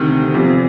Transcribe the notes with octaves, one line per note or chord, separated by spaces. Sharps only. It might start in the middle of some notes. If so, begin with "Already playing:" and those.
Already playing: D2 C3 D#3
E2 C3 F3